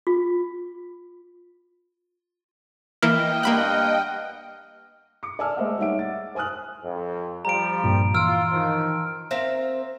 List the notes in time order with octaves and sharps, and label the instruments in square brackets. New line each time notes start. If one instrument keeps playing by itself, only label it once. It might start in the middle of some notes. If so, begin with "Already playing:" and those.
[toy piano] F4
[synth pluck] E3 A#3 E4 [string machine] D#5 G5 [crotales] F6
[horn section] G2 F5 F#5 [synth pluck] A#3 B5 F#6
[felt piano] D6 C#7
D5 G#5 A5 E6 F6
G#3 A3 C5 D#5 E5 F#5
G3 D#4 C#5 E5 F#5 D7
A6
C5 G#5 D#6 F6 F#6
[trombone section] F2
[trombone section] F3 G3 [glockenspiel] A#5 D7
[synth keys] G2 A#2
[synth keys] E3 D7 [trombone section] F4 [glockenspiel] E6 F6
[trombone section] D#3 F3
[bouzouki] C4 A#4 E5 F5